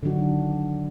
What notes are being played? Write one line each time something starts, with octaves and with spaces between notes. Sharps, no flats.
D3 D#3 F#3 D4 F#4